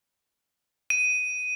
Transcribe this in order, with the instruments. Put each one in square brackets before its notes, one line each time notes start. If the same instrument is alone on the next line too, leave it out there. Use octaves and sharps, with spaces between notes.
[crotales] D#7